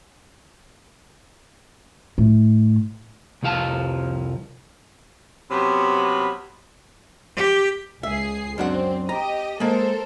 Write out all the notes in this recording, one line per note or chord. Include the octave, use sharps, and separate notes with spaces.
A2
C2 F2 F3 F5 A5
C3 F#3 B3 C#4 B5
G4
C#2 G#4 E5 C7
F#2 C4 D4 F#5
G4 D#5 A#5
G#3 A#3 A4 A#4 C5